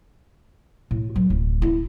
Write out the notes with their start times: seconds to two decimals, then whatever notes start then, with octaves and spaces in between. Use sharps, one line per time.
0.91 A2
1.16 F#3
1.30 D1
1.62 E4